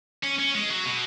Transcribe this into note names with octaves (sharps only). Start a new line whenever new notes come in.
C#4
C#4
G#3
F#3
B2